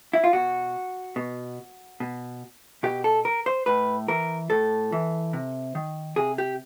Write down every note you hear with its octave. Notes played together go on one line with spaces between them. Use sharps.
E4
F4
B2 F#4
B2
B2
B2 G4
A4
A#4
C5
A2 B4
E3 A#4
A2 A4
E3
C3
D#3
C3 G#4
G4